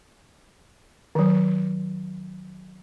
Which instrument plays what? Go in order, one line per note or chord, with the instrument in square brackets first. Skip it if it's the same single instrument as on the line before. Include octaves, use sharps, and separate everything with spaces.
[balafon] D#3 F#3